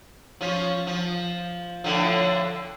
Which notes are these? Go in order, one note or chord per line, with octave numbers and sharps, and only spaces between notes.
F3 C#4 F4
F3
A2 D3 F3